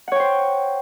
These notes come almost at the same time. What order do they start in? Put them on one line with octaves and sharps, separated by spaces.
F#5 C#5 G5 C5